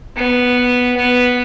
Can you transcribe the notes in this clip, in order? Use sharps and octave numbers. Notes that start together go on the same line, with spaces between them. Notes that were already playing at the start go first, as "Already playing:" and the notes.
B3
B3